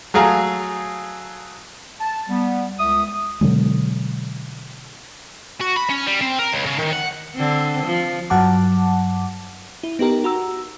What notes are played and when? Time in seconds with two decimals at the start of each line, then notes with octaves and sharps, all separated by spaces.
0.14 F#3 A3 G#4 F5 A#5
2.01 A5
2.29 G3 B3
2.79 C#2 E5 D#6
3.41 B2 D3 F#3 G#3
5.61 F#4
5.76 B5
5.90 C#4
6.07 G3
6.21 C4
6.39 A#4
6.52 C#2
6.66 C#3
6.79 D#3
6.93 F#5
7.35 D3 C4
7.86 F3
8.30 G2 F#3 F#5 A5 D6
9.83 E4
9.99 B3 D#4 G4 A#4
10.24 F#4 A#5 E6